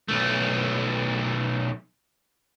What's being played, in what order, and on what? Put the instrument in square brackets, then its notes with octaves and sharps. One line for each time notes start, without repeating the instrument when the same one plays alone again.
[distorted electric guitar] B1 A3